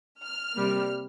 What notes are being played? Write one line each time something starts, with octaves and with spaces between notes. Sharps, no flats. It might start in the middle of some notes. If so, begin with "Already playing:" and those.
F6
C3 G3 A#3